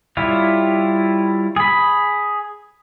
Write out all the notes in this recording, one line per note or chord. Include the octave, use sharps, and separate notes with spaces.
G3 E4 F4 C#5
G#4 B5